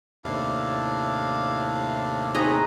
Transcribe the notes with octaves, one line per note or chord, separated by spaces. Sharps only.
D#2 A2 C3 D4 E4 F5
C4 D#4 G#4 B4 C#5 D#5 A#5 B5